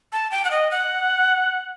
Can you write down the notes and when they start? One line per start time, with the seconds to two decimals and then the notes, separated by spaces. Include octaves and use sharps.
0.12 A5
0.31 G5
0.45 F#5
0.51 D#5
0.71 F#5